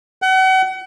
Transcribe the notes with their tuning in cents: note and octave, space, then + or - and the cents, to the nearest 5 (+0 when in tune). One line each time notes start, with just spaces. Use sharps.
F#5 +35